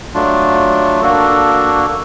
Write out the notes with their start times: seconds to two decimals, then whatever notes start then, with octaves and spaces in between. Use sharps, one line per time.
0.14 F#3 A3 D4 F4
1.02 A#3 D4 F#4 A4